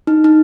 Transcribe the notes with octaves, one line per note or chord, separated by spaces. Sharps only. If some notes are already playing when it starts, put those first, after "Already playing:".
D#4
D#4